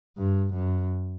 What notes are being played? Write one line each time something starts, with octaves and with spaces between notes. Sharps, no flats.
G2
F#2